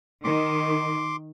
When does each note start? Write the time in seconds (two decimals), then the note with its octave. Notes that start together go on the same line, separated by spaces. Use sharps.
0.24 D#3 C6 D6